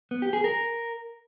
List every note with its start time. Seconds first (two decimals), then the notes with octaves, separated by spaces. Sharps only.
0.11 B3
0.22 G4
0.33 G#4
0.44 A#4